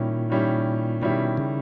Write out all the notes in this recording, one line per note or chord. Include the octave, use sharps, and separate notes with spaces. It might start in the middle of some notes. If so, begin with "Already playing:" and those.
Already playing: A#2 D#3 G3 C#4 E4
D#3 G3 C#4 E4
B2 D#3 G3 C#4 E4
C#3